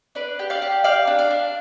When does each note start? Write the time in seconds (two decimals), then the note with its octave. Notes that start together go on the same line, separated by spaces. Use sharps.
0.15 D4 B4 D5
0.39 G4
0.50 D5 F5
0.62 G4
0.84 G4 D5 F5
1.07 D4
1.19 D5 F5
1.30 D4